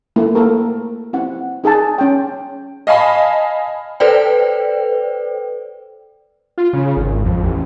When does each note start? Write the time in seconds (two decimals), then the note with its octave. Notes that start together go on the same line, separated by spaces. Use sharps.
0.16 A3 A#3 E4
0.35 A#3 A4 A#4
1.13 C4 E4 F#5
1.64 D#4 G#4 G#5 A5
1.98 C#4 G5
2.87 D#5 F5 G#5 A5 B5
4.00 A4 B4 C5 D5 G5
6.58 F4
6.73 C#3
6.97 G#1
7.25 F2
7.43 A1